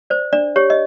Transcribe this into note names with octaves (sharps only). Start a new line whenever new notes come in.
C5 D5
D4 D5
G4 C#5
D#5